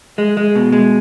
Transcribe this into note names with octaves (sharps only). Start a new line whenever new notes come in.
G#3
G#3
B2
G#3